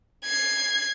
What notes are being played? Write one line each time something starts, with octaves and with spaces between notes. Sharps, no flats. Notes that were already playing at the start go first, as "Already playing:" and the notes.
G#6 C7